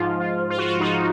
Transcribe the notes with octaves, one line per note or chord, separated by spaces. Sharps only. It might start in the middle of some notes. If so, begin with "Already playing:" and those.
Already playing: G#2 F3 F4
F4
F4
F#4
F4
D#4 F#4